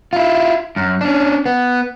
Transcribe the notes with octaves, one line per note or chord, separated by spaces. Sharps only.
E4 F4
F#2
C#4 D4
B3